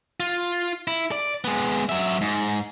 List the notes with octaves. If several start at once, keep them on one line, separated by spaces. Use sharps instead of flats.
F4
E4
D5
G#3 B3
F#3 E5
G#2